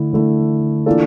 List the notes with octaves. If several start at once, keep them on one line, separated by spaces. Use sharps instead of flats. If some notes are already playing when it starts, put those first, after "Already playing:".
Already playing: D3 A3 E4
D3 A3 E4
E3 A#3 D4 F4 A4